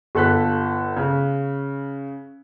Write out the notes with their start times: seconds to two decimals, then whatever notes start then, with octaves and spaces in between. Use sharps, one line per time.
0.15 G1 A4 F#6 B6
0.97 C#3